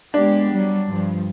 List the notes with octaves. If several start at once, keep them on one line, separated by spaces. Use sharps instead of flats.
G#3 B3 D4 G4
F#3 G3
G2 F3